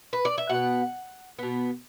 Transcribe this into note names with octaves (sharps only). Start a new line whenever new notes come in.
B4
D5
E5
B2 B3 F#5
B2 B3